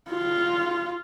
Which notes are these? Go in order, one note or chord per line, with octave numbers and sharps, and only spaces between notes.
F4